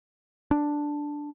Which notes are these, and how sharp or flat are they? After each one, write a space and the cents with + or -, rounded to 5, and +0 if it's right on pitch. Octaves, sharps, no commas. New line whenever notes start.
D4 +0